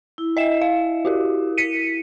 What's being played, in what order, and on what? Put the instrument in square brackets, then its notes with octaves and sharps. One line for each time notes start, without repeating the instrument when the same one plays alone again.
[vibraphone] E4
[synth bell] D#5 E5 E7
F5
F#4 G4 A#4
B6 C#7 D#7